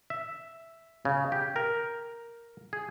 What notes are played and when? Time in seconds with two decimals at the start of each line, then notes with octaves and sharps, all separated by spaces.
0.10 E5
1.05 C#3
1.32 G4
1.56 A#4
2.73 G#4